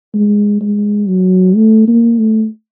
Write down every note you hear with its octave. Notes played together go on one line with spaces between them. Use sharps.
G#3
G#3
F#3
A3
A#3
A3